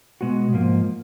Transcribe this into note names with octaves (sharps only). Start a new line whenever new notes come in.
B2 G#3 B3 F#4
G#2 F3 A#3